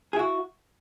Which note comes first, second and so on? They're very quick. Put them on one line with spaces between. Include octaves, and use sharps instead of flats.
G#4 E4 F#4